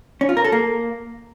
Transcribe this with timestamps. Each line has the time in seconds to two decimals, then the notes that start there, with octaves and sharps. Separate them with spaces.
0.21 C#4
0.29 F4
0.37 A#4
0.45 A4
0.52 A#3